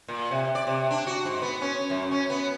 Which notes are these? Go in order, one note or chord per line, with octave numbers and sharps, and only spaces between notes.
A#2
C3
D5
C3
D4
F#4
G#2
B3
C#4
F#2
C#4
B3